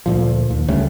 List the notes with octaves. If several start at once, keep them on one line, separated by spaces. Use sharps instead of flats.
D2 A#2 F3
D#2
D2 C#3 G3 A3